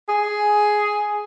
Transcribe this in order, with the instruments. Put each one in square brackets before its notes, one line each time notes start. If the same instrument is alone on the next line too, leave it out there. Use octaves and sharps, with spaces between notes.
[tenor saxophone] G#4